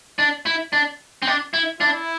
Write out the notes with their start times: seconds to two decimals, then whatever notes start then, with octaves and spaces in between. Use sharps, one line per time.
0.19 D4
0.46 E4
0.73 D4
1.22 C4
1.27 D4
1.54 E4
1.81 D4 E4